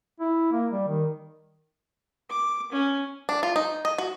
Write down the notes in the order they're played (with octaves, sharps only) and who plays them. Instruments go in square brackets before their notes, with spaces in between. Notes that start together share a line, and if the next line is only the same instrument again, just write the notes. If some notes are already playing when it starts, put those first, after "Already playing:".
[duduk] E4
A#3
G3
D#3
[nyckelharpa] D6
C#4
[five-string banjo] D4
F4
D#4
D#5
F#4